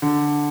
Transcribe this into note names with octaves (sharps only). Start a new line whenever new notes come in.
D3